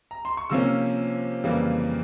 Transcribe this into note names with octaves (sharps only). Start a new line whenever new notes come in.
A#5
C6
C#6
C3 F3 A#3 C#4 E6
F2 C#3 E3 G3 A#3